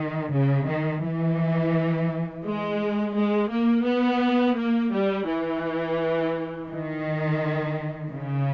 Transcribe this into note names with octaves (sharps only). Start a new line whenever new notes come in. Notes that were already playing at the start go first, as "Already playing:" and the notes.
Already playing: D#3
C#3
D#3
E3
G#3
G#3
A#3
B3
A#3
G3
E3
D#3
C#3